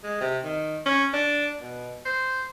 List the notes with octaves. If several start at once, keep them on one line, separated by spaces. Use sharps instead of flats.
G#3
C3
D#3
C#4
D4
B2
C5